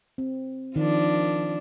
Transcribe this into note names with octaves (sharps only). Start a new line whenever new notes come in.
C4
D#3 F3 D4